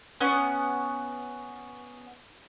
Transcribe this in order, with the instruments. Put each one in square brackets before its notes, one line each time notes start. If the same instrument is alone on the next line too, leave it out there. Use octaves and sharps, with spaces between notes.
[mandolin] B3 C#4 F#5